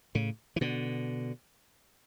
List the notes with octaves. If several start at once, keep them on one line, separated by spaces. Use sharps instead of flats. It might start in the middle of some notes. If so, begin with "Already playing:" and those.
A2 C#3
E3
B2 D3